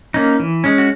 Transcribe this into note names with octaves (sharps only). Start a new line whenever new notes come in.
A#3 C#4 D#4
E3
G#3 C#4
F#4